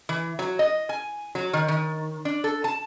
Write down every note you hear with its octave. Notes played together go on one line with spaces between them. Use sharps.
E3
F#3
D#5
G#5
F#3
D#3
D#3
D4
A4
A5